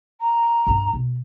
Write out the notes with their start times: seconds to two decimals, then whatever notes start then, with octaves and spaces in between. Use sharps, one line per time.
0.20 A#5
0.67 G2 D4
0.93 B2